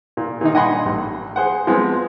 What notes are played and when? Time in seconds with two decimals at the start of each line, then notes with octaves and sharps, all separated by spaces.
0.17 A#2
0.41 A#2 D#3 D#4
0.54 G2 D#5 F#5 G#5 B5 C6
0.86 A1
1.36 G#4 C5 F#5
1.67 F3 G#3 B3 C4